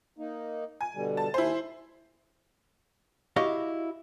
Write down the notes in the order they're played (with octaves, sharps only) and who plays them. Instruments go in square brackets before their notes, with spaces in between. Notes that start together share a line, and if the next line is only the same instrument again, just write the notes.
[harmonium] A#3 D#4
[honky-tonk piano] G#5
[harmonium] B2 D3 G3
[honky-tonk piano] A5
[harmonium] D#2 G#5 [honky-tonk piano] E4 C5
[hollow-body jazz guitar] E4 F#4 G4 D#5 F5